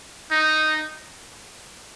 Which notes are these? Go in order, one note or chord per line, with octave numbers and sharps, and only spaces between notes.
D#4